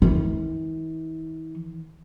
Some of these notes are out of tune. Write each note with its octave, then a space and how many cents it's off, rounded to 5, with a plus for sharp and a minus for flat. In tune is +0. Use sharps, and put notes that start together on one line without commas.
E3 -45